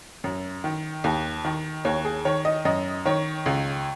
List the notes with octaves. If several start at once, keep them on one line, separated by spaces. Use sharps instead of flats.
F#2
D#3
D#2
D#3
D#2 C#5
G#4
D#3 C#5
D#5
F#2 D#5
D#3 C#5
C#2